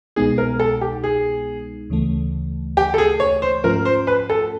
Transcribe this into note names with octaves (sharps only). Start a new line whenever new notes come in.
C2 B2 G#3 B3 D#4 G#4
A#4
A4
G4
G#4
D2 C#3 E3 A3
G4
A4
G#4
C#5
C5
G#2 F3 A3 C#4 F4 A#4
C5
B4
A4